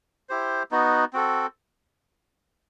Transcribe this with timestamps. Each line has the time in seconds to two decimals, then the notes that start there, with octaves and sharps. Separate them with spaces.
0.29 E4 G4 C5
0.71 B3 D#4 F#4
1.13 C4 F#4 A4